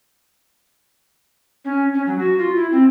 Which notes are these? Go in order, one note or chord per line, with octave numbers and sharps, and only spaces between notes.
C#4
C#4
F#3
F#4
F4
E4
C4